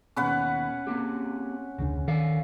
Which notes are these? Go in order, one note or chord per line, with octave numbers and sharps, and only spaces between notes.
D#2 B2 C#4 B4 F#5
A#3 C4 G4
F1 D2 C#3 D4
D#3 A4 D5 F5